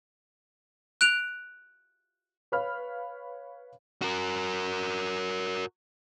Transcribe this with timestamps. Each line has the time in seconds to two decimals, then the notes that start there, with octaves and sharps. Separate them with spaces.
1.01 F#6 D7 F7
2.52 B4 C#5 F5 B5 F6
4.02 F#4 A#4